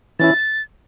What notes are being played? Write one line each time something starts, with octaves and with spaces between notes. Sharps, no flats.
E3 C#4 E4 A6